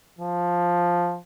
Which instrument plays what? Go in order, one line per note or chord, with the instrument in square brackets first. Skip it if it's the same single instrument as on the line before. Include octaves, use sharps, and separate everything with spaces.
[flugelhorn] F3